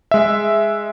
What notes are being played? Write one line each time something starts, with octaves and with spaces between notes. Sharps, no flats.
G#3 E5